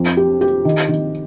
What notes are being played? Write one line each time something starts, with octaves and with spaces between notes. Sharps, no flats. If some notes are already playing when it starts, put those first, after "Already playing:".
Already playing: F2
G4
G4
D#3
D#3